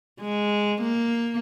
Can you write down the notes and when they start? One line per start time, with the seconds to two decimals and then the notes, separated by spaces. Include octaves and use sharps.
0.20 G#3
0.82 A#3